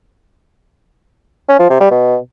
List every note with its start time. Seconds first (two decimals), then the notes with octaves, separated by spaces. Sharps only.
1.49 C#4
1.59 F3
1.70 C3
1.80 G3
1.91 B2